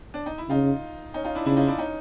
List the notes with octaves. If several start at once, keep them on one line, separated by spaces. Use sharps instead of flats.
D4
D#4
E4
C#3 D#4 F4
C#4 D#4
D#4 F4
D4 E4
C#3 D4 E4
D#4 F4
D4 E4
C#4 D#4